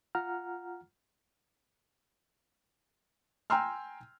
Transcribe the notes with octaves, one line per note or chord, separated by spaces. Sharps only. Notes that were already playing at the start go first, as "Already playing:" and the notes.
F4 F#5 A#5 F6
G5 G#5 A#5 C6 E6 F6